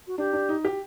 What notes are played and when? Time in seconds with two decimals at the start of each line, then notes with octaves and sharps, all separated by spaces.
0.07 F#4
0.18 D4 G4
0.33 D4
0.49 D#4
0.65 G4